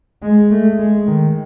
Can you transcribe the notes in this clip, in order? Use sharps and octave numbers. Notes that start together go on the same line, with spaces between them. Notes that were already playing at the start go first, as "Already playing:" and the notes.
G#3
A3
G#3
D#3